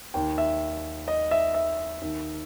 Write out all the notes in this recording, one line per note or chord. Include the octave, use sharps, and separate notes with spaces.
D#2 D#3 G5
E5
D#5
E5
E5
D#2 D#3